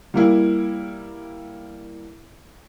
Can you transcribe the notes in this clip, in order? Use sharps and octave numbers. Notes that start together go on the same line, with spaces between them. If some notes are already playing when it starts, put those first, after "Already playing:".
G3 A#3 E4